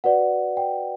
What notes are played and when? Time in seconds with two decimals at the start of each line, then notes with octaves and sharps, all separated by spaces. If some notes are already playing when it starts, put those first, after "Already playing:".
0.04 F#4 B4 D5 F#5
0.57 G5